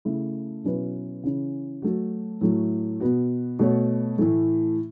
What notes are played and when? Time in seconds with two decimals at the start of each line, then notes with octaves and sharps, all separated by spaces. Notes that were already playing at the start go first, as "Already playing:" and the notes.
0.05 C#3 A3 E4
0.64 B2 F#3 C#4 E4 B4
1.23 C#3 E3 C#4
1.82 F#3 A3 F#4
2.41 A2 F#3 A3
3.00 B2 B3 F#4
3.59 B2 A3 F#4 C#5
4.18 A2 E3 A3